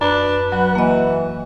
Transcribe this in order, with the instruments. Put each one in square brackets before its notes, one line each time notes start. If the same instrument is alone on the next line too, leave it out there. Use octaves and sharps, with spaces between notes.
[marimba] F#2 [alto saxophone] D4 [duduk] B4
[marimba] F#3 [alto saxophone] F#4
[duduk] E3 [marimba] A#3 D#5